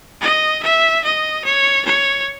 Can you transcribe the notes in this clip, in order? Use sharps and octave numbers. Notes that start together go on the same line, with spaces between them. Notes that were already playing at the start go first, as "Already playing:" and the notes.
D#5
E5
D#5
C#5
C#5